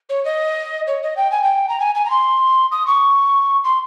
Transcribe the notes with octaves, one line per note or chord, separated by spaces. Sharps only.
C#5
D#5
C#5
D#5
G5
G#5
G5
A#5
G#5
G#5
A#5
C6
D#6
C#6
C6